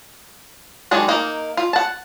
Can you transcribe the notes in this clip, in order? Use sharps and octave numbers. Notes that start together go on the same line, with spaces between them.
D#3 F#3 G#3 D4
A#3 D#4
F4
F#5 A5